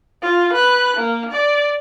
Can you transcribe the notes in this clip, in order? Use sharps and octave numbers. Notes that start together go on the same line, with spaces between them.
F4
B4 F#6
A#3
D5